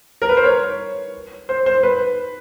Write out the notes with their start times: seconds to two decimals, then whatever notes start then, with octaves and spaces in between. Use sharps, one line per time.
0.22 A#4
0.29 B4
0.37 C5
0.44 C#5
1.49 C5
1.66 C5
1.83 B4